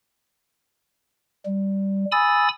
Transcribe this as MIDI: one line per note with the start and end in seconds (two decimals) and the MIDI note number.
1.46 2.05 55
2.12 2.48 80
2.12 2.48 83
2.12 2.48 87
2.12 2.48 88
2.12 2.48 93